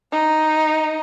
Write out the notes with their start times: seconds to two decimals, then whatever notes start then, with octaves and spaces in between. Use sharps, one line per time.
0.12 D#4